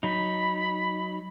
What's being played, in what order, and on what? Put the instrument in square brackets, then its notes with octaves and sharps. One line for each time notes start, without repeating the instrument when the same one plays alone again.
[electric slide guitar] F#3 D#4 [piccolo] B5